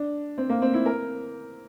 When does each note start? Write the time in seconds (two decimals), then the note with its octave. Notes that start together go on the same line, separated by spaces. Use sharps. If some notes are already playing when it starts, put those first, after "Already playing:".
Already playing: D4
0.38 C4
0.50 A#3
0.62 C4
0.74 E4
0.86 A#4